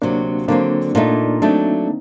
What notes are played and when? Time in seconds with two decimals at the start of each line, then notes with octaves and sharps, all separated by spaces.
0.02 D2 C3 F#3 A#3 D4
0.48 D3 F#3 A#3 C4 D4
0.95 A#2 A3 A#3 D4 D#4
1.42 F#3 A3 C4 D4 D#4